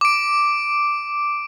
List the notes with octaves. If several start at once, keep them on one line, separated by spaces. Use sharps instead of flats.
D6 D7